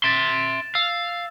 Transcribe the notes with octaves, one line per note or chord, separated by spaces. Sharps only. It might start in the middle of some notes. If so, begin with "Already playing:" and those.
E5 C6 A6 E7
F5 E6